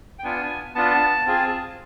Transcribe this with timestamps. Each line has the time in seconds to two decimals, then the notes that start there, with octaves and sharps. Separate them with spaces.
0.19 G5
0.24 B3 D4 F4 G#5
0.75 B3 D4 F4 A5
1.26 C4 F4 G#4